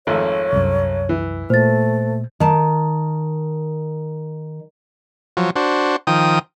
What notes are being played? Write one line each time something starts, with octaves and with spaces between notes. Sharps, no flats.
G#1 F2 A3 C#5
C2 F#2
E3
A#2 A3 C5 A6
D#3 A5
F3 F#3
D4 F#4 C5
D#3 F3 G5 D#6